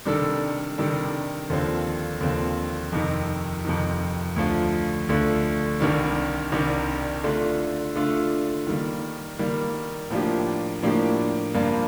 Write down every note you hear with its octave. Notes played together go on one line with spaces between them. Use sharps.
C3 D#3 G3 D4 A4
C3 D#3 G3 D4 A4
D#2 D3 F3 C4
D#2 D3 F3 C4
F2 C3 D#3
F2 C3 D#3
D2 D3 F3
D2 D3 F3
C2 C3 D#3 G3 D4
C2 C3 D#3 G3 D4
D3 A3 D4 F4
D3 A3 D4 F4
D#3 G3 A#3
D#3 G3 A#3
A2 F3 A#3 D4 G4
A2 F3 A#3 D4 G4
G2 F3 A#3 D4 F4